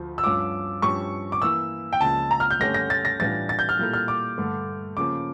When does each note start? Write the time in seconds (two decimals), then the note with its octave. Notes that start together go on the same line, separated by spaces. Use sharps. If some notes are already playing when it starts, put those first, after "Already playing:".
Already playing: D2 F3
0.18 E6
0.23 G2 F3 C#4 F4 D6
0.82 G2 F3 C#4 G4 C#6
1.32 D6
1.42 E3 A#3 E4 E6
1.93 G5
2.01 C#2 C#3 F3 A#3 A5
2.31 A#5
2.40 F6
2.51 G6
2.60 G2 D3 A3 C#4 G4 A#6
2.74 A#6
2.90 A6
3.05 A#6
3.19 A2 E3 G3 D4 F4 A6
3.49 A6
3.59 G6
3.69 F6
3.79 A#2 G3 A#3 E4 A4
3.93 F6
4.08 D6
4.38 G2 D3 A3
4.97 C#3 F3 A#3 D6